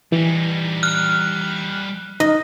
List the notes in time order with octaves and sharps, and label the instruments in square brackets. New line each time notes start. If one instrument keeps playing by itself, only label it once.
[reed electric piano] E3 [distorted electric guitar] G3 D#4
[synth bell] F6 F#6
[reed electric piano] D#4 [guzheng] D#5